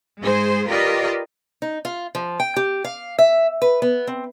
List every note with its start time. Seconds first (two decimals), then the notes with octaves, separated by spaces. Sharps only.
0.21 G#2 G#3 G#4 C5
0.69 F4 G4 A#4 B4 D5 D#5
1.62 D#4
1.85 F4
2.15 F3
2.40 G5
2.56 G4
2.84 F5
3.18 E5
3.62 B4
3.82 B3
4.07 C4